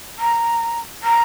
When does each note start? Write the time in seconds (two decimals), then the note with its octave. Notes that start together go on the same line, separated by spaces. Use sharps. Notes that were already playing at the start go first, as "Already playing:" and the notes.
0.18 A#5
1.03 A#5